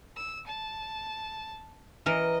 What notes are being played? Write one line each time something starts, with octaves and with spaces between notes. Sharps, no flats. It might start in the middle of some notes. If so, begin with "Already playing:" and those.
E6
A5
E3 A#4 D#5